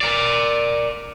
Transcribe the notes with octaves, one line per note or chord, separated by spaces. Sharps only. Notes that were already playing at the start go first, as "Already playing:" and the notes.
A#4 D5